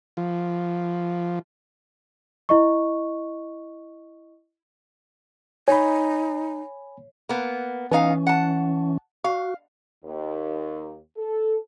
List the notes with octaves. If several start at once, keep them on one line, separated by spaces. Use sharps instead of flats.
F3
E4 D#5 C#6
D#4 C#5 G#5 B5
A#3 B3
E3 B3 C#4 D#4 F5
F#5 A5
F#4 F5
D#2
A4